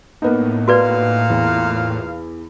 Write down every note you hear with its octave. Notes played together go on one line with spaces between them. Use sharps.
A2 A#3 B3 D#4
A#2 F#4 B4 D5 F5
E2